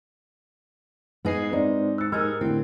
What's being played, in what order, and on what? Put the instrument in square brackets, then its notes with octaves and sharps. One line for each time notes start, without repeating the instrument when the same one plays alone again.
[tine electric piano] G#2 D#5 C7 [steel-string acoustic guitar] B3 G#4 [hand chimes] B4
[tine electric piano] G#2 [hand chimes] C4 C5 D5 [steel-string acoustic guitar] D#4 [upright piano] D#5
[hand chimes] E6 C#7 [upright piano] F#6 A6
[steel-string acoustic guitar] D#4 G#4 [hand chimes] G4 A#4 [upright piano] E6 F6 G#6
[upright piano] A2 D3 [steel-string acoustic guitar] C4